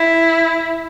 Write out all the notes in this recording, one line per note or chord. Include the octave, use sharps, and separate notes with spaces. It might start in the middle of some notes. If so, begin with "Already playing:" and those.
Already playing: E4